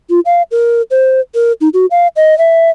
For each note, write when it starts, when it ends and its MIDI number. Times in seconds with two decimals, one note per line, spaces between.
0.10 0.20 65
0.26 0.42 77
0.51 0.82 70
0.91 1.20 72
1.35 1.52 70
1.61 1.69 63
1.74 1.86 66
1.91 2.07 77
2.16 2.37 75
2.38 2.70 76